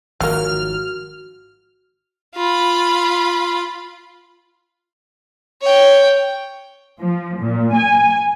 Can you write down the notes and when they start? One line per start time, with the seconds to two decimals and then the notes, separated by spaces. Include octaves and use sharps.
0.20 G#1 D#3 F3 F#3 A#3 F#4 F6
2.36 F4 B5
5.62 C#5 G5
7.00 F3
7.41 A#2
7.77 G#5